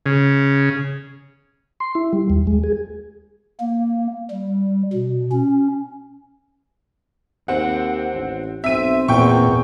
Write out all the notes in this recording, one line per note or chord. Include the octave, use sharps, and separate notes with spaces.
C#3
C6
E4
G3
D#2
G#3
G#4
A#3
G3
B2
C#4
D#2 C4 F#5
A1
B1 C4 E5 D#7
E2 A#2 G5 C#6